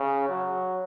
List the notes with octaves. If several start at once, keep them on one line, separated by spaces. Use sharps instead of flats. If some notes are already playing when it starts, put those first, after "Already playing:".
Already playing: C#3
F#3